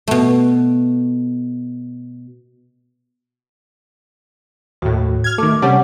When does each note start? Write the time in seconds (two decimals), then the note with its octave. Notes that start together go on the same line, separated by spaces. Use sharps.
0.08 B2 A3
4.82 D#2 A2 F#4
5.24 F6 G#6
5.38 D#3 A3 D6
5.62 C3 G3 C#4 G4 F#5 A5